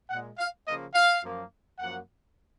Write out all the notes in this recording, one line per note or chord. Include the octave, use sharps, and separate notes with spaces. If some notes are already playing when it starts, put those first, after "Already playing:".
A#2 G#3 F#5
F5
C#3 F3 A#3 D#5
F5
F#2 F3 A#3
F#2 F3 A#3 F#5